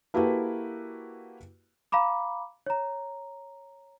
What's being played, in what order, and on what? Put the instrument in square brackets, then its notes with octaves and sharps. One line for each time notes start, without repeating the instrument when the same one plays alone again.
[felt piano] A#3 E4 F#4 G4 A4 B4
[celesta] F5 A#5 B5 D6
C#5 A#5